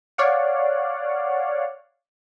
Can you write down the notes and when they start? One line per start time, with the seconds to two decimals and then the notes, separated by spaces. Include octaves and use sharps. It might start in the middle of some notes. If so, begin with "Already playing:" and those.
0.18 C#5 D5 F5 F#5